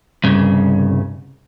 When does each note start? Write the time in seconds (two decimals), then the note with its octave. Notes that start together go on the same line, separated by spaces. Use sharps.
0.24 C2 G2 C#3